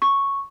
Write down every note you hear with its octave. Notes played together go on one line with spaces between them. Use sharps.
C#6